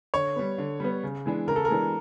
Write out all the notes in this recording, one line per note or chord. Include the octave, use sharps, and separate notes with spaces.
D3 C#5
G3 B3
D3
G3 B3
C#3
E3 G#3 B3 D4
C#3 A#4
A4
A#4
E3 G#3 B3 D4